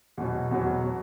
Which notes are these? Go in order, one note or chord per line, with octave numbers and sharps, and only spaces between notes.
E2 B2 F#3
E2 B2 F#3
B2 F#3